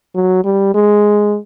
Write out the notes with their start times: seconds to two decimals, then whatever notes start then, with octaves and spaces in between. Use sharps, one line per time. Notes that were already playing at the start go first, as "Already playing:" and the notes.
0.15 F#3
0.45 G3
0.74 G#3